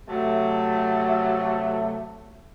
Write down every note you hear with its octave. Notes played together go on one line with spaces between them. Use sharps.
C3 F#3 A3